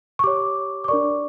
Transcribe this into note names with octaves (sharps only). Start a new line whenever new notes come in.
C#6
G4 C#5 D6
D6
D4 A#4 D5 C#6